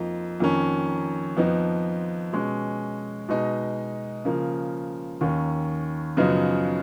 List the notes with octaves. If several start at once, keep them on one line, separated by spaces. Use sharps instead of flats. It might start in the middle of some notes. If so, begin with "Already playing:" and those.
Already playing: F2 F3 A#3 D#4
F2 D#3 A#3 C#4
F2 F3 B3 D#4
B2 G#3 C#4
B2 G#3 D#4
C#3 F3 A#3
D#2 D#3 A#3 C#4
F#2 C#3 F3 B3 D#4